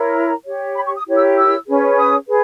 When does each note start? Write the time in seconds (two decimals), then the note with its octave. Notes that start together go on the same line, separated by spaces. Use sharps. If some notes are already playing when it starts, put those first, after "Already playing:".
Already playing: E4 A#4 C#5
0.14 A#5
0.45 G4 C#5
0.76 B5
0.85 C#6
0.96 D#6
1.06 E4 G4 A#4 C#5
1.16 E6
1.36 E6
1.67 C#4 G#4 B4
1.97 D#6
2.28 G#4 B4